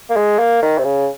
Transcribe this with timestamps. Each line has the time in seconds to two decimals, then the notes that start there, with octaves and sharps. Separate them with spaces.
0.10 A#3
0.16 G#3
0.39 A#3
0.62 D#3
0.78 C3
0.84 C#3